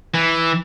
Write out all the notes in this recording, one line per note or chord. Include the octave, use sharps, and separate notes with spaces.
E3